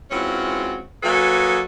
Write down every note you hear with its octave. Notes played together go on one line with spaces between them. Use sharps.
E3 G#3 C4 C#4 F4 F#4
F#3 A#3 A4 B4 D#5 G#5